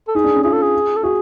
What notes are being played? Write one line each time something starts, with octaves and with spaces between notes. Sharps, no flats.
A4
D#4 G#4
D4
C#4
F4 G#4
A4
G#4
A4
F#4 G#4